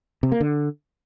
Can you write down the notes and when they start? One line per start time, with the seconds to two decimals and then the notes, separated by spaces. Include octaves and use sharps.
0.23 C3
0.32 A#3
0.40 D3